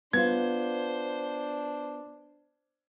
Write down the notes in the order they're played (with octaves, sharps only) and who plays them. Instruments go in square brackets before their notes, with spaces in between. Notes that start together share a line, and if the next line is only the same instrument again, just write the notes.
[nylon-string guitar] B3 F4 [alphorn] D4 [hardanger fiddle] C5 [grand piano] G#6